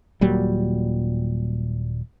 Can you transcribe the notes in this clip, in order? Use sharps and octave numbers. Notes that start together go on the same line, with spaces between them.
D#1 A#2 F#3 G3